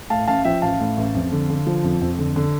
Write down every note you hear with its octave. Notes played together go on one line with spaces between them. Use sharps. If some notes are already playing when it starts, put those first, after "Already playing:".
A2 F5 A5
A1 F5 A5
F3 E5 G5
A1 F5 A5
A2
A1
F2
D3
D3
F3
F2
F2
D3
D3